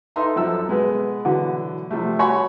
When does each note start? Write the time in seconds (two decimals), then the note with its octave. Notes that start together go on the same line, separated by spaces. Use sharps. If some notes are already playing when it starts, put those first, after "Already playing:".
0.16 D#4 A4 B4 E5 A#5 C6
0.36 F#2 F3 A4 E6
0.67 B2 G#3 B3
1.25 B2 D3 E3 F#3
1.91 C3 F3 G3 A3
2.19 F#4 C#5 G#5 B5 C#6